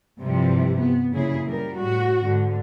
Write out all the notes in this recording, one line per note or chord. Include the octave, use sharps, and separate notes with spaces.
G2 C3 E3 F3 G3
B3
F#2 A#2 C#3 E4 G#4
G3 A#4
A2 F#4
G#2 D3